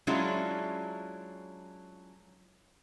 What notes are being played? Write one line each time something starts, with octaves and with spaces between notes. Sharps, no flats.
F#3 G#3 C#4 D4 E4 F4